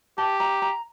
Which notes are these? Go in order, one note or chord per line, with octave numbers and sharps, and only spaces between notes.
G4 A5
A#5
A#5